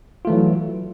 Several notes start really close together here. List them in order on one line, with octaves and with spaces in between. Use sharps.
F4 A3 E3 F#3